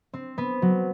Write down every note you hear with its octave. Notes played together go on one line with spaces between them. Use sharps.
C4
B3
F#3